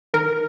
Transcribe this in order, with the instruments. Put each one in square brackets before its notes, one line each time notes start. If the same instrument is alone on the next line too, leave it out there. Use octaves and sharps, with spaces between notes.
[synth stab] D#3 A#4